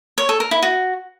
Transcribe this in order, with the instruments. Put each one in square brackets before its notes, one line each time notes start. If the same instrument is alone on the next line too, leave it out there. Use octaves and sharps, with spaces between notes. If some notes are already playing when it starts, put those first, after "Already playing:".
[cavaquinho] C#5
A4
A#4
E4
F#4